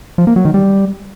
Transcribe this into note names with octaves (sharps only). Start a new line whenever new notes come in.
F3
A#3
F#3
D#3
G3